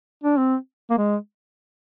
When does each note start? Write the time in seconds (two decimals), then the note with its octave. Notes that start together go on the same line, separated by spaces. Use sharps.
0.24 D4
0.37 C4
0.90 A#3
0.98 G#3